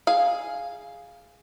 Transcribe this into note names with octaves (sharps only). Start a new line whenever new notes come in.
G#4 F5